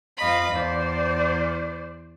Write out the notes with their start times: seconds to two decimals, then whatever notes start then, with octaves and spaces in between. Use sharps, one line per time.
0.19 F2 D#5 F5 B5
0.55 E2 C5 D5